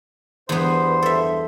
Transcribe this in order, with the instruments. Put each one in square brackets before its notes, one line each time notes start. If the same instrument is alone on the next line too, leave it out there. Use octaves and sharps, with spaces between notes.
[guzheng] E2 B3 [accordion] G2 C5 C6
[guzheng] A4 E5